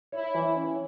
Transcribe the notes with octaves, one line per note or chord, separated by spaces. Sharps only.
E4 C#5
E3
C#4